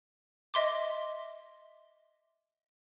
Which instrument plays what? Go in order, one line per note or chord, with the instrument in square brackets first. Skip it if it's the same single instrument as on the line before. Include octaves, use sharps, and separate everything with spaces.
[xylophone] D#5 E5 C6 D6